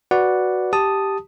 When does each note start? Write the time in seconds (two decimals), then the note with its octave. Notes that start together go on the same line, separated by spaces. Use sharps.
0.11 F#4 B4 D5 F#5
0.73 G4 A5 D#6